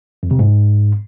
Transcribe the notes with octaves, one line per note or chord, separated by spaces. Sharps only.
F2
C3
G#2